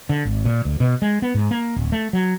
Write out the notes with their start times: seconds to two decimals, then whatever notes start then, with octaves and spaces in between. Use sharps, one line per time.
0.09 D3
0.25 G#1
0.45 A#2
0.65 D2
0.80 B2
1.02 G#3
1.22 B3
1.35 G#2
1.51 A#3
1.76 D1
1.92 A3
2.13 F#3